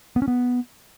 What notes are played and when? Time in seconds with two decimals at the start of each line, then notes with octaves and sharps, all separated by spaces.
0.16 B3
0.22 C#4
0.28 B3